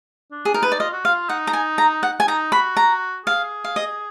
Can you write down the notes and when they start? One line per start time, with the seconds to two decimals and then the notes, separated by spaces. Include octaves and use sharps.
0.31 D4
0.45 G#4
0.54 D#4 A#4
0.63 B4
0.72 D5
0.80 F4 D#5
0.93 F#4
1.05 F4 F5
1.29 D#4 F#5
1.47 A#5
1.53 G#5
1.78 A#5
2.03 F#5
2.20 G#5
2.27 D#4 A#5
2.52 F#4 B5
2.77 A#5
3.26 G#4 F5
3.64 F5
3.76 D#5